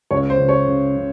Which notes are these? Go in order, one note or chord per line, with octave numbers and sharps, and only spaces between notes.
C#2 C#5
C5
C#3
C#5
C#3
C#3